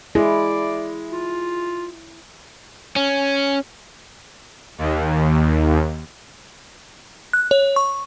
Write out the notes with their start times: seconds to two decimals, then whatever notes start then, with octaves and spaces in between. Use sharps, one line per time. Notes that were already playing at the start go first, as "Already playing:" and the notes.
0.15 G#3 E4 D5
1.12 F4
2.96 C#4
4.78 D#2
7.33 F#6
7.51 C#5
7.76 C#6